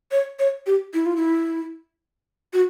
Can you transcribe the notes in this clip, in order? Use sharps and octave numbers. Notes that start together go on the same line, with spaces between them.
C#5
C#5
G4
E4
F4
E4
F#4